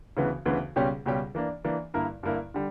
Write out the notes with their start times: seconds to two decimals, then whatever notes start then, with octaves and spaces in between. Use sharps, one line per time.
0.17 D2 C#3 E3 B3
0.46 D2 C#3 E3 B3
0.76 C#2 B2 G3 C#4 G4
1.06 C#2 B2 G3 C#4 G4
1.35 E3 A#3 D4
1.64 E3 A#3 D4
1.94 G2 D3 A#3 E4 A#4
2.23 G2 D3 A#3 E4 A#4
2.54 D3 G3